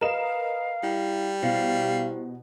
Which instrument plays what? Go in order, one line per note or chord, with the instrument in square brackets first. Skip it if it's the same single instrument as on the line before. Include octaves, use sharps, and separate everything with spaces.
[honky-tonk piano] A#4 D#5 E7 [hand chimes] B4 [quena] F5
[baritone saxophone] G3 [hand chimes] E4
[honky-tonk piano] B2 [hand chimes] E4 G4 C5 [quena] F5